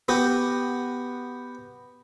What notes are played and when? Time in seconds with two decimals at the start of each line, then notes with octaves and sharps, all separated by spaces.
0.08 B3 F#4 G4